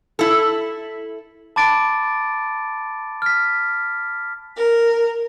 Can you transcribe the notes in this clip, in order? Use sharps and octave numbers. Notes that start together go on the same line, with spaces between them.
E4 A4
A5 B5 D6 A6 D7
F6 B6
A#4